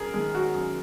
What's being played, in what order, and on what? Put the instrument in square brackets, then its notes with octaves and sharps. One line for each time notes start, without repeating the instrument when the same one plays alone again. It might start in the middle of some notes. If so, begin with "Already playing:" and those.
Already playing: [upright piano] F#2 G#4 A#4
D#3 G#3 G#4
F#4
F#2